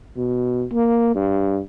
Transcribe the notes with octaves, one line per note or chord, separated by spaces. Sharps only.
B2
A#3
G2